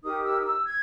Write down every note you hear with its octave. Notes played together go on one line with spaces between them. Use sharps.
D#4 G4 A#4 D#6
E6
D#6
E6
G#6